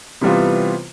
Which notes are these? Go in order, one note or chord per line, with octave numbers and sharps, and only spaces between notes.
C3 E3 G3 B3 F4